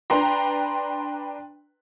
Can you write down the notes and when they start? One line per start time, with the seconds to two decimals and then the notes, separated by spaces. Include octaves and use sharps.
0.10 D4 B4 G5 A#5 C6